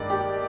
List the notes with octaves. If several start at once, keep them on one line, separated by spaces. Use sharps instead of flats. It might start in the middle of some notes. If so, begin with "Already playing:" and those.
Already playing: G2 D#3 G#3 D5
G4